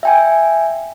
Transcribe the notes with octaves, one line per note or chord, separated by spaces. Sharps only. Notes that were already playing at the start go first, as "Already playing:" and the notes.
E5 G5 G#5